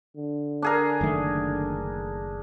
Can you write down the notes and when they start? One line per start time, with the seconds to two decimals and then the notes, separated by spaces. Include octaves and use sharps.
0.17 D3
0.62 D4 G#4 A#4
1.01 F#1 D#3 A3